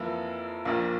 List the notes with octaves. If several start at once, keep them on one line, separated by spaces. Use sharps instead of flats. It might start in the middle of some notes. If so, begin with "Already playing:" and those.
Already playing: F2 E3 A#3 E4
A#1 A#2 F3 F4